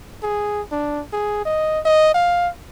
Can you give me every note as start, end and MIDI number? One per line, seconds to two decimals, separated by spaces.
0.23 0.61 68
0.72 1.02 62
1.13 1.40 68
1.45 1.80 75
1.85 2.14 75
2.14 2.49 77